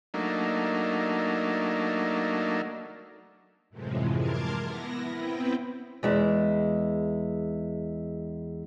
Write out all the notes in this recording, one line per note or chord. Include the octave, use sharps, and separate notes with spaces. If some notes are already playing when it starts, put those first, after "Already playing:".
F#3 A3 A#3 D4 D#4
F#2 A2 C3 E3 F3 G#3
A#4 A5 C6 D6 F6 G#6
B3 E4 A#6
B3 C4 E4 B4 G5
E2 G#3 E4